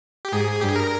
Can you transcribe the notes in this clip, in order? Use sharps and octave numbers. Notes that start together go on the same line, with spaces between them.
G4
G#2 G#4
G2 G4
G#4
A#4